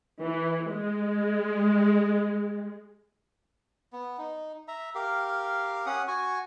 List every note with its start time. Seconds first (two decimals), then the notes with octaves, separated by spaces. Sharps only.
0.25 E3
0.72 G#3
3.93 B3
4.18 D#4
4.68 E5 A#5
4.95 G4 A#4 F5
5.86 C#4 F#5 D#6
6.08 F#4 G#5 C#6